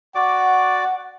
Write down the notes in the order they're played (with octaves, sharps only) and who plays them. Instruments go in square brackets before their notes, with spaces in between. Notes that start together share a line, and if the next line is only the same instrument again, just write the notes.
[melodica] F#4 D5 D6 [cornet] F#5